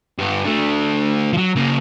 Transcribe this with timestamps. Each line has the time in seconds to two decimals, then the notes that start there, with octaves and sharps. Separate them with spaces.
0.18 G2 B3
0.45 A3 D4
1.33 F3 F#3
1.56 C#3 A#3